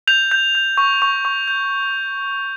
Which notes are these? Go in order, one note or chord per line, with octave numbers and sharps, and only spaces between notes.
G6 F7
G6
G6
C#6
C#6
C#6
G6